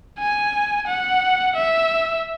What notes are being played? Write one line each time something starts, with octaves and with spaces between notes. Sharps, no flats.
G#5
F#5
E5